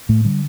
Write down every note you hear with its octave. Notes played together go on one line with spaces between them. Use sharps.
A2 A3
D3 G3